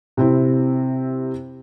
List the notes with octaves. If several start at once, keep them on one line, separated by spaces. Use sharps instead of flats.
C3 C4 E4